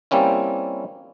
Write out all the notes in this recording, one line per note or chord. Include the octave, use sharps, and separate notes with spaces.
G3 A#3 C4 C#4 E4